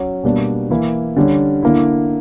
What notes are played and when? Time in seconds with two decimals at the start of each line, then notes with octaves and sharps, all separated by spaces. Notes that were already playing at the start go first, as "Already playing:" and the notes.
Already playing: F#3 C#4 F#4
0.24 B2 G3 A#3 D4
0.70 E3 A#3 E4
1.16 D3 G3 C#4
1.63 D3 A#3 E4